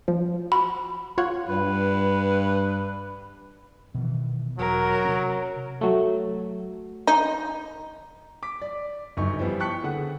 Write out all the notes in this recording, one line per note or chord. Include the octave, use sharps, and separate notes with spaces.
F3
F#4 B5
F4 C#5 F#5
G2 B4
B2 D#3 E3
E1 F#3 A#4
C3 C#4
F#3 A3
D#4
D6 B6
D5
G1 F#2 D#4 C#6
E3 F3 G3 B3 E4
G5 A5 C#6 F#6 B6 C#7
D3 G#4 F#5